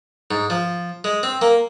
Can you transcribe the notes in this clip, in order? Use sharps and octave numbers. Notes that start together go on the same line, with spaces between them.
G#2
F3
G#3
C4
A#3